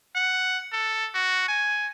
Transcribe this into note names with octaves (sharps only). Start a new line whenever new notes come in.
F#5
A4
F#4
G#5